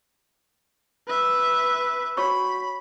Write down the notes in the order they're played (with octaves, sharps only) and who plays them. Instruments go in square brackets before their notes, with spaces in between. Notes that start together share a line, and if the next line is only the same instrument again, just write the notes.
[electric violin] B4 E5
[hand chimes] F#4 C#5 C#6 [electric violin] B5